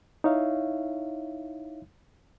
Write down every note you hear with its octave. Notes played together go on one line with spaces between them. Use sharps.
D#4 E4 C#5 E5 F5